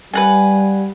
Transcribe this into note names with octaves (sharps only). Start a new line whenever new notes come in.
G3 B4 F#5 G#5